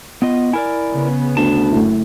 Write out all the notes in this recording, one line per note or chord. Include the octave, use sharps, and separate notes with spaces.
B3 F4 D#5
E4 A#4 D5 G#5
C#3 B3
D2 A5
F#1 F#2 A3 E4